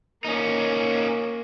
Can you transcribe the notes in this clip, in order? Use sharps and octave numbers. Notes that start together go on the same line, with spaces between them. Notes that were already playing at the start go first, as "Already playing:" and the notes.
A#3 C#4 D#4